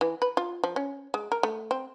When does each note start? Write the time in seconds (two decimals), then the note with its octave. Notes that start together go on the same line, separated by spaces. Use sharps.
0.01 E3
0.22 B4
0.37 F4
0.64 F3
0.76 C#4
1.14 G#3
1.32 A#4
1.43 A3
1.71 C4